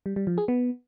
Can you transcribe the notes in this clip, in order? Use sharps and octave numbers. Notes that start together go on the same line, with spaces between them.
G3
G3
F3
G#4
B3